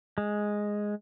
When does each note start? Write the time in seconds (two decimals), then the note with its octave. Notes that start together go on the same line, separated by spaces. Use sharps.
0.18 G#3